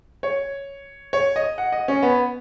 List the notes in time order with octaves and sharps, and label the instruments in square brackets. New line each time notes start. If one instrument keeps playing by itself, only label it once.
[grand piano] C#5
C#5
D#5
F#5
D#5
C#4
B3